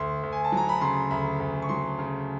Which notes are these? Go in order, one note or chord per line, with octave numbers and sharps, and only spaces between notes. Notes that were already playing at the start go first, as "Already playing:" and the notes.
Already playing: D2 C6
D2
G#5
A5
F#3 A#5
B5
C#3 C6
D2 B5
D2
C#6
F#3 C6
C#3